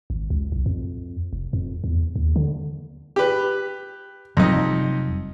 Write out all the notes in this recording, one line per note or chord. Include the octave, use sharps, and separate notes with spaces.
G#1
C#2
B1
F2
F1
F2
E2
D#2
D3
G4 B4
F1 F2 F#3 G3 D#4